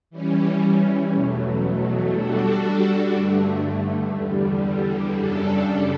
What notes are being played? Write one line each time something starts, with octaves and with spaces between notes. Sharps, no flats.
E3 G3 C#4
E2 B2 F#3 A3
G3 D4 F#4 A4
G2 D3 A3
E2 D3 G3
F#2 C#3 G3 D4 A4